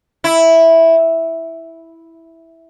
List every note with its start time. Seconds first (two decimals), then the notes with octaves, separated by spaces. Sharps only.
0.24 E4